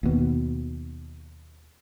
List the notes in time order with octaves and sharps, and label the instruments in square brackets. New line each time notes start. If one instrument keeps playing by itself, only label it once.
[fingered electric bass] D#2 B2